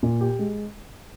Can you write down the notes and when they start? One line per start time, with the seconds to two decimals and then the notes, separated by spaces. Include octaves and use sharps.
0.03 A#2
0.21 G4
0.39 G#3